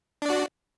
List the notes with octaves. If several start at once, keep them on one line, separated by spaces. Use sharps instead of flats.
D4 F#4 D5